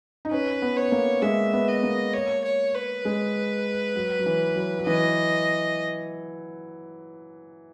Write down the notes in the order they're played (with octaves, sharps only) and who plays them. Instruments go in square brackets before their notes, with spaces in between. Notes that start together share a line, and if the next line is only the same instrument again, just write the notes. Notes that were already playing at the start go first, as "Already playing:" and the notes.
[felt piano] D#4
[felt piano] C#4 [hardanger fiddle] B4
[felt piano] B3
[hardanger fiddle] C#5
[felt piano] A#3
[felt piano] G#3 [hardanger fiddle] E5
[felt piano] B3
[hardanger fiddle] D#5
[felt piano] A#3
[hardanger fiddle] C#5
C#5
B4
[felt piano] G#3
F#3
F#3
E3
F#3
F#3
[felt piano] E3 [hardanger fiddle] D#5